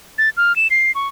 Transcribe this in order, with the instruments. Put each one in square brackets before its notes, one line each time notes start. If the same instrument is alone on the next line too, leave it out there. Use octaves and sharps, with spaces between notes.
[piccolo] A6
F6
E7
C7
C#6